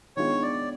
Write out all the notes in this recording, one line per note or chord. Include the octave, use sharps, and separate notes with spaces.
D#3 G#3 B3 D4 F4 C#5
D5